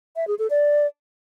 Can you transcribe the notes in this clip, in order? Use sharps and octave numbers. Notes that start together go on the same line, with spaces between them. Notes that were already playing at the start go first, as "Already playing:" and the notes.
E5
G#4
A4
D5